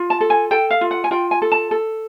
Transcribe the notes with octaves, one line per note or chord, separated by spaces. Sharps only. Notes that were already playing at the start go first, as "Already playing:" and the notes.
Already playing: F4
A5
A4
G#5
A4 G5
F5
F4
F#5
G#5
F4 G5
G#5
A4
A5
A4